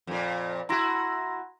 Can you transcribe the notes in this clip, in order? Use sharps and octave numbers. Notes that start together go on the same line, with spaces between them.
F2 A#2
E4 F#4 A#5 C6 A#6